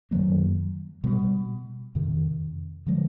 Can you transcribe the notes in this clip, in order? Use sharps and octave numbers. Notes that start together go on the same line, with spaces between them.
F#2 D#3 F#3 A#3
B2 G3 B3
F2 C3 D#3
D3 F3 G#3